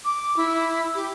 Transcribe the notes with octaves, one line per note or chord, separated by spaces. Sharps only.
D6
E4
G4